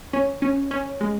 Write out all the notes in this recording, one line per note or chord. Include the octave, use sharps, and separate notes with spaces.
C#4
C#4
C#4
G#3